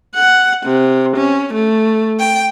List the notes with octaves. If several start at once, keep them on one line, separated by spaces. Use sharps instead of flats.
F#5
C3
C#4
A3
G5